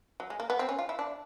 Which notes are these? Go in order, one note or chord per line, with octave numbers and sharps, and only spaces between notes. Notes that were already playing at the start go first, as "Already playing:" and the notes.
F#3
G#3
A#3
B3
C4
C#4
F4
E4
D4